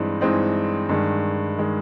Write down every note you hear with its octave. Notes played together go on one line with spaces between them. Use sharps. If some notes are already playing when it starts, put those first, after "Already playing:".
Already playing: G2 E3 G#3 C4 D#4
G2 E3 G#3 C4 D#4
G2 D#3 G#3
D#3 G#3